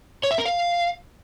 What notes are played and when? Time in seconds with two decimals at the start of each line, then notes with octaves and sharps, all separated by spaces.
0.23 C#5
0.31 E5
0.38 A#4
0.45 F5